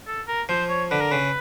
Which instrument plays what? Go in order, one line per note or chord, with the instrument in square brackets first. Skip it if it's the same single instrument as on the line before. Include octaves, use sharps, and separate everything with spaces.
[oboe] A4
A#4
[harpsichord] F3 [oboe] C5
[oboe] C#5
[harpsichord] D3 [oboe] B4
[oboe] A#4
[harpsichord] C#3 [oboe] B4